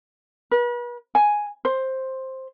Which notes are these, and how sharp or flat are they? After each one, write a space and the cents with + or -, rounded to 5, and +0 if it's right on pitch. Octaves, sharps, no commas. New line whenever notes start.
B4 -40
G#5 +0
C5 +10